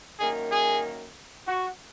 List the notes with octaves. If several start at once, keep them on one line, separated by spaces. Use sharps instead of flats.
F#2 D#3 A#3 G#4
G#4
F#4